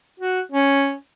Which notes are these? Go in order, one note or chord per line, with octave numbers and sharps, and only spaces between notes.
F#4
C#4